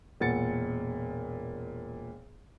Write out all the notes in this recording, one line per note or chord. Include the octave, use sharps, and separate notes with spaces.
E1 A#2 F#5 A6 C#7